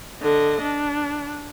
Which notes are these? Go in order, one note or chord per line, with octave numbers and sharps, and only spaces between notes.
D3 D#5
D4